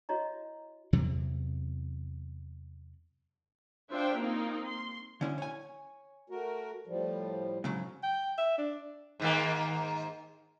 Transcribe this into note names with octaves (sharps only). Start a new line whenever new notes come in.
E4 F#4 C#5 D#5 A#5
E2 C3 E3 F#3
D4 F4 C5 E5 G5
A#3 C4 D#4 F4 A#4
C6
D3 C#4 E4
C#5 G#5
A3 F#4 A#4
A2 F3 G3
G#2 C#3 F#3
G5
E5
D4
G#2 D#3 A#3